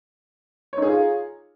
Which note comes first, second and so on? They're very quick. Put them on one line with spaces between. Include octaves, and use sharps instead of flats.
C#5 D#4 G#4 F4